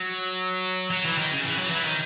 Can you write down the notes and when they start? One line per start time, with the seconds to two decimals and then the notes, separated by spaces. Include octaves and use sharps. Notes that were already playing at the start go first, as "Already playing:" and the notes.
Already playing: F#3
0.90 F#3
1.05 E3
1.18 D#3
1.31 C#3
1.45 E3
1.58 F#3
1.70 E3
1.84 D#3